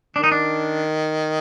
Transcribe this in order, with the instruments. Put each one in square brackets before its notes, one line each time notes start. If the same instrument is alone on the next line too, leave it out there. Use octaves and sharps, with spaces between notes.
[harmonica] D#3 [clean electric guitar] D4
[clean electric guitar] D#4
D4